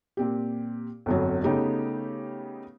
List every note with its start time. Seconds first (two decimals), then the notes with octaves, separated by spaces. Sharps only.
0.17 A#2 C4 G4
1.06 G1 F2 F#3
1.44 C#3 A3 B3 D#4 G4